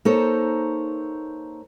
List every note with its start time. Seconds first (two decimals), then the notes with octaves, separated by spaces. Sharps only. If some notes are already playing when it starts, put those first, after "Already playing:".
0.05 A#3 D#4 A4 C5 C#5